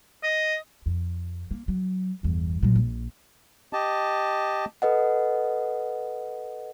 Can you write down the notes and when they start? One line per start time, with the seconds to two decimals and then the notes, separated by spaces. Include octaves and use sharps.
0.23 D#5
0.86 F2
1.51 A#3
1.68 F#3
2.23 G1 E2
2.63 A#2 F#3
2.75 A#1
3.73 G4 D#5 A5
4.82 A4 B4 D#5 F#5